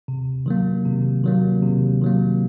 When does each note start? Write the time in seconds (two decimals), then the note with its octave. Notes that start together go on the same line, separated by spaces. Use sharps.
0.08 C3
0.46 D#3 F#3 A#3
0.85 C3
1.24 D#3 F#3 A#3
1.63 C3
2.02 D#3 F#3 A#3